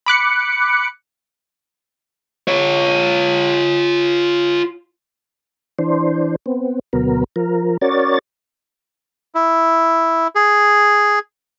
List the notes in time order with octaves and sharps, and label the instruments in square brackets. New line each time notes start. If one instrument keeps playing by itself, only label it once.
[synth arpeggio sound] B5 D6 F#6 C#7
[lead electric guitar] F4 C#5
[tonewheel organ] E3 D4 C5
B3 C4
D2 B2 F#3 B3 A#4
F3 A#4
C#4 F#4 A#4 C#5 D5 A6
[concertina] E4
G#4